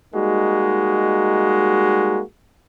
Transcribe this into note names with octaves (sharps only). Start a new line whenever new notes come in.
G3 G#3 A#3 D#4 F#4